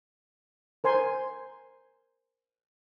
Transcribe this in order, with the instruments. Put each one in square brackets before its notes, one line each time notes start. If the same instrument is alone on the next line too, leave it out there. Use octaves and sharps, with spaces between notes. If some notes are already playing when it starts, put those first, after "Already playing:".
[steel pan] A#4 C5 G#5 C6